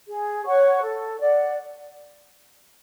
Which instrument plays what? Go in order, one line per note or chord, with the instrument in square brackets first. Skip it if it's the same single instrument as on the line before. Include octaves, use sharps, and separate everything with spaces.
[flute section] G#4
C#5 F#5 C#6
A4
D5 F#5